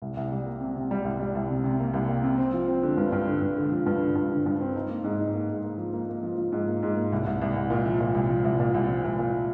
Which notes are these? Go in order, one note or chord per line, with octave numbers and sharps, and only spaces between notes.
C2
C2
G3
A#3
C3
C3
G3
C2
G3
C2
C3
C3
A#3
C2
A#3
C3
C4
F3
C4
D3
G2
G2
D3
G2
D3
F3
G2
D3
G2
D3
G2
C4
D#4
A#3
G#2
D#4
A#3
G#2
A#3
F3
A#3
A#3
F3
F3
G#2
A#3
G#2
A#3
C2
C2
C2
C2
A#2
F3
A#2
C2
F3
C2
A#2
C2
F3
C2
A#2